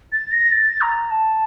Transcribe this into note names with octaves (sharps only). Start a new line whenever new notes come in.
A6
A#6
A6
A#5
A5